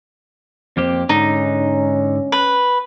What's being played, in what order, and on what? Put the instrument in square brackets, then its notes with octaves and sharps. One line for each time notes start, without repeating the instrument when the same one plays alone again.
[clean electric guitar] F2 A#3 G4 [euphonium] C4
[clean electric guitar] G#2 D3 [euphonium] C#4 [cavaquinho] D#4
[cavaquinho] B4